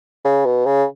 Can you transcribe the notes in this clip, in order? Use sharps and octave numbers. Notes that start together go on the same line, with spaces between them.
C#3
B2
C#3